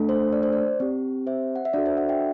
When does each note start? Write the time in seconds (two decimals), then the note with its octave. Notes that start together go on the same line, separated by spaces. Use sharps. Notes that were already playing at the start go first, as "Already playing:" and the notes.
Already playing: A3 D4 A4
0.09 C5
0.33 D5
0.43 C5
0.53 D5
0.80 C4 G4
1.27 C5 E5
1.56 F#5
1.65 E5
1.73 D4 F#4 A4 D5
1.86 C5 E5
1.97 D5 F#5
2.09 E5 G5